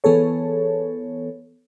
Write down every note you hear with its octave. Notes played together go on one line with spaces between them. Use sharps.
E3 B3 G#4 A4 C#5